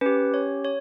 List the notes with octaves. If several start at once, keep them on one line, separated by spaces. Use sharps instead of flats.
C#4 G4 B4
C#5
C#5